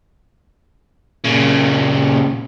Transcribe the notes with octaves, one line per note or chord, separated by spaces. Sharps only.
A#2 C#3